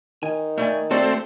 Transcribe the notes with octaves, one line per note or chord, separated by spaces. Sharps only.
D#3 G#5
A3 D5 G#5
A3 C4 F#4 A4 D5